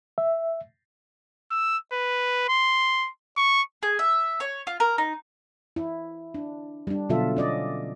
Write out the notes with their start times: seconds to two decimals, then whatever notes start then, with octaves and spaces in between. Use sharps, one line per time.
0.18 E5
1.51 E6
1.93 B4
2.49 C6
3.37 C#6
3.83 G#4
3.99 E5
4.40 C#5
4.67 F4
4.80 A#4
4.98 D#4
5.76 E4
6.34 D4
6.87 G3 D4
7.09 B2 D3 F#3 F4 A4 E5
7.37 C#4 D5 D#5